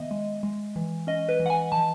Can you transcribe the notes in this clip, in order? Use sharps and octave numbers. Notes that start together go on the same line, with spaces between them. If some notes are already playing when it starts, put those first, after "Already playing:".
Already playing: D#3 B3 D#5 E5
G#3
G#3
E3
C#4 D#5
B4
E3
F#5
G#5
E3 A5